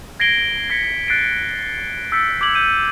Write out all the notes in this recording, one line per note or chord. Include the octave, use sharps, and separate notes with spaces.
G#6 A#6 C7 D7 G7
G#6 A#6 B6 C#7
F#6 A6 B6 C7 D7
E6 G6 A6 B6 C#7
D6 G6 G#6 F#7
G6 D#7 F#7